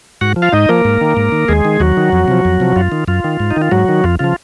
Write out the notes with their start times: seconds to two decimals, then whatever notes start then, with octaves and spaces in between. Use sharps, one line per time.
0.21 G#2 F#4 F#5
0.36 F3
0.42 F4 F5
0.52 G#2 D#4 D#5
0.69 F3 A#3 A#4
0.85 G#2
1.01 D#3
1.17 G#2
1.32 D#3
1.48 D#2 G#3 G#4
1.65 D#3
1.80 D#2 F#3 F#4
1.97 D#3
2.12 F2
2.28 C3 F3
2.45 F2
2.60 C3 F3
2.76 F#2 F4
2.92 D#3
3.08 F#2 F4
3.24 D#3
3.40 G#2
3.51 D#4
3.56 D#3
3.62 F4
3.71 G#2 F#3 F#4
3.89 D#3
4.04 F2 F4
4.19 C#3 F3 F4